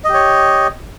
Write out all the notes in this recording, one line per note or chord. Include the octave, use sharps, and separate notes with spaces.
G4 C#5 D#5